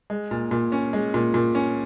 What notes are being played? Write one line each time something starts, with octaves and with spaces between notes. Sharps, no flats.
G#3
A#2
A#2
C#4
G#3
A#2
A#2
C#4